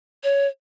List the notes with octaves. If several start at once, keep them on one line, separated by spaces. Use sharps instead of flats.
C#5